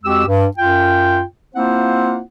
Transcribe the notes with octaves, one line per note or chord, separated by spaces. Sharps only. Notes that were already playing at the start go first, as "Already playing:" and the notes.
F2 G#3 F#4 G4 E6
G2
F#2 F4 G5
A#3 C4 E4 F4 C5 F#5